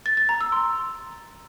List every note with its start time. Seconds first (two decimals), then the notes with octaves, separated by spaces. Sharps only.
0.06 A6
0.17 A6
0.29 A#5
0.41 E6
0.52 C6